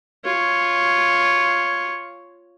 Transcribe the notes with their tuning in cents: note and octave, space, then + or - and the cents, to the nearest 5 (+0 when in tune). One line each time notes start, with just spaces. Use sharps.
F4 +0 C#5 +0